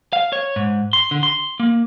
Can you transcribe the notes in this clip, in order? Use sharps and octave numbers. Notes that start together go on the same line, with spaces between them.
F5
C#5
G#2
C6
D3
C6
A#3